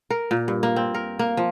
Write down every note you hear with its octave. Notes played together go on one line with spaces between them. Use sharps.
A#4
A#2
G2
A#3
C4
A#4
A#3
F3